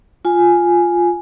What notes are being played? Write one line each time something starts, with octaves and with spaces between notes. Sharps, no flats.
F4 G#5